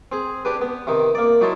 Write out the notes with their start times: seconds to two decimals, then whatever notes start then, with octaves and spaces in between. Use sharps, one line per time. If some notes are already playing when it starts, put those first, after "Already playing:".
0.12 C4 G#4
0.45 D4 G4 B4
0.61 B3
0.87 C3 D#3 D#4
1.15 A#3 D5
1.41 F#3 D#4 E4 A5 C6